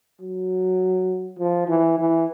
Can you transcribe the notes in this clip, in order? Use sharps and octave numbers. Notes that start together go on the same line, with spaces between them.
F#3
F3
E3
E3